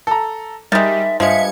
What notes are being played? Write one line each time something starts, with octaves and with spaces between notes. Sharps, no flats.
A4 A#5
D#3 G3 G#3 E5 A6
G2 F3 G#3 E5 G#6 C#7